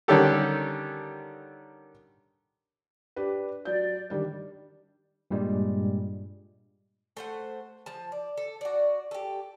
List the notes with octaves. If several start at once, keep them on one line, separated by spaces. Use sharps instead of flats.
D3 D#3 G3 C#4 G4 A4
D4 G4 B4
F#3 D5 G6
D#3 G3 D4
G2 A#2 G3 G#3
A3 C5 F#5
F3 A5
D5
A4
F#4 D5
G4 A4